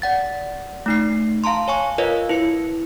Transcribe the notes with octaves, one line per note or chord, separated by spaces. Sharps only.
D5 F#5 A6
A3 D#4 C7
F5 A5 A#5 C6
C#5 G#5 C#6
F4 A#4 B4 C#5 D#5 F5
E4 B4 C#7